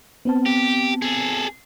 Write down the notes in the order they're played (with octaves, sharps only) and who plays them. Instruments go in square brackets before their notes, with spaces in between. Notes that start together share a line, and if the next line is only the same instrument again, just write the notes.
[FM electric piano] B3 C4 A5
[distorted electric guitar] G4
G#4 A4